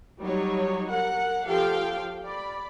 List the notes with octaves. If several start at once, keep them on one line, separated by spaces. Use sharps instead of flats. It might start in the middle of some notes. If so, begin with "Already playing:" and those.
F#3 G3 D#4 C#5
A#4 F#5
F3 G4 A4 F5 G5
D5 B5